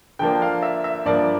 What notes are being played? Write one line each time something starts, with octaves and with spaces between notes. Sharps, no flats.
D3 F3 A#3 D4 G5
F5
E5
E5
G2 F3 A#3 D5